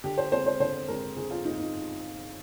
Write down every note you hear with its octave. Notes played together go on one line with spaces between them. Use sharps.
D3 G4
C5
G#3 C4 C5
C5
D3 C5
G#3 C4 A#4
D3 G#4
F4
G#3 C4 D#4
D#4